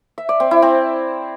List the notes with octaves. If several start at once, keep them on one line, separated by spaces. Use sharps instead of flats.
E5
D5
C4
E4
C4